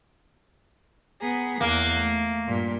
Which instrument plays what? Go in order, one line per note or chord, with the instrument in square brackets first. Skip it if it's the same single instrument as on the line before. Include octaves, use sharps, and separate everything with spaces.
[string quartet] B3 G#4 A#5
[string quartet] E2 F#6 [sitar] A#3
[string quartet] A3
G2 A#2